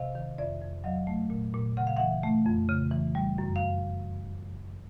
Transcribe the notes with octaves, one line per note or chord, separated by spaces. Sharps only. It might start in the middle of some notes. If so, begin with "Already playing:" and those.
Already playing: C3 D#5 F5
D#3
F2 D5 E5
F2
F#3 D#5 F5
A3
A#2
A#2
C#3 F#5
F5
E3 E5 F#5
A3
F2
C#3
E3
G3
F#2
F5